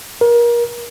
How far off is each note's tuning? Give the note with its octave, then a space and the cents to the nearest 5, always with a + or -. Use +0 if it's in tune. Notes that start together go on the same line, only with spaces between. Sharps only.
A#4 +30